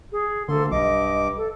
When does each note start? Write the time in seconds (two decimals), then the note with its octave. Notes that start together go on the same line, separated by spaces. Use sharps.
0.12 G#4
0.49 D2 D3 A#3 A4 C6
0.71 B1 G2 D#5 D6
1.37 A4